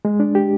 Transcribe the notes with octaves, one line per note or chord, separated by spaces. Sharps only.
G#3
D4
G4